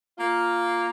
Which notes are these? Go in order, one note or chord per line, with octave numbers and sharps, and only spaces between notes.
A#3 F4